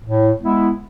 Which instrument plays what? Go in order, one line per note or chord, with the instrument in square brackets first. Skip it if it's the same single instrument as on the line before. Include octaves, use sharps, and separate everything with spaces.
[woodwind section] A2
G#3 B3 E4